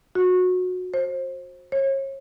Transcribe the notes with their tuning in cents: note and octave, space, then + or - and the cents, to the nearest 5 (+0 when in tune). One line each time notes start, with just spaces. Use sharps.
F#4 -20
C5 +25
C#5 -35